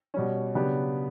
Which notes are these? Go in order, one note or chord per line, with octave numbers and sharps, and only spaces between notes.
B2 G3 C#4
C#3 F#3 B3 D4 G4